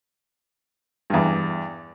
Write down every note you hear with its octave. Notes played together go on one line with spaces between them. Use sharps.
E2 G2